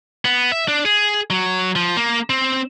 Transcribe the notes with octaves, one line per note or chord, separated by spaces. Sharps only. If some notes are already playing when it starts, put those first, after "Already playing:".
B3
E5
D4
G#4
F#3
F3
A#3
C4